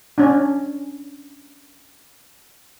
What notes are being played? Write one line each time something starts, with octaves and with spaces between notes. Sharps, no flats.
C#4 D4